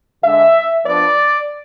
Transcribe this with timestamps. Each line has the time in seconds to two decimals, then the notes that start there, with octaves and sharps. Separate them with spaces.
0.23 D3 G#3 D4 E5
0.84 F3 B3 D4 D5